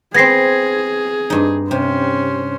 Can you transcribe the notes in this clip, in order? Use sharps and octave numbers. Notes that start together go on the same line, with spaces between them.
B3 C4 G#4 G#6 A#6 C7
G2 D#4
C3 C#4 C5